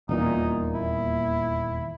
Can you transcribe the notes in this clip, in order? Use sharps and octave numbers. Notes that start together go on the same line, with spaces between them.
D#1 E2 A#2 D#4
E4